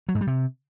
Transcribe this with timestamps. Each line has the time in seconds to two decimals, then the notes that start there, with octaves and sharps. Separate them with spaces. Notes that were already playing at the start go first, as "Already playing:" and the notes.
0.09 F#3
0.15 G#2
0.21 G3
0.27 C3